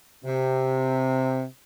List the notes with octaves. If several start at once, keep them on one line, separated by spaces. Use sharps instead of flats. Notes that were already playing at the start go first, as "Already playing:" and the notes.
C3